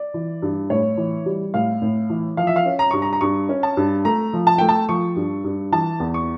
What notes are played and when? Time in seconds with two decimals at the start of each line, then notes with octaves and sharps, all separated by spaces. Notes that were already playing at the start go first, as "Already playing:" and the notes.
Already playing: D5
0.14 E3
0.42 G2
0.70 A2 C#5
0.97 E3
1.26 G3
1.54 A2 F5
1.82 A2
2.10 E3
2.37 F3 F5
2.47 E5
2.56 F5
2.66 C#4
2.79 A#5
2.91 G2 C#6
3.02 A#5
3.13 A#5
3.21 G2 C#6
3.49 C#4
3.63 A5
3.77 G2
4.05 A3 A#5
4.33 F3
4.47 A5
4.58 A3 G5
4.69 A5
4.89 F3 C#6
5.16 G2
5.44 G2
5.72 E3 A5
6.00 E2
6.14 C#6